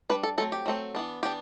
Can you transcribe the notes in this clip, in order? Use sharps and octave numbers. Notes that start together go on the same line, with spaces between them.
G3 D4 B4
A4
F#3 A3 C4 A4
G4
F#3 A3 C4
E3 B3 D4
E3 B3 D4 G4